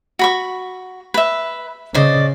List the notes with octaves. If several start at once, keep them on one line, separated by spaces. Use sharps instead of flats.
F#4 B5 C#6
B4 E5
C#3 C5 D5 D#5